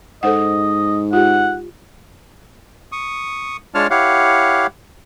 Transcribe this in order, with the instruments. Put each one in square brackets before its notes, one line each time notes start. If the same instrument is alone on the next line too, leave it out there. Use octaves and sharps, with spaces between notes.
[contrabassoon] G#2 [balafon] A4 C5 F#5 [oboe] D#5
[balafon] F4 G4 [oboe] F#5
[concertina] C#6 D#6
G#3 D4 F4 C#5 A5 F6
E4 G4 C#5 F5 F#5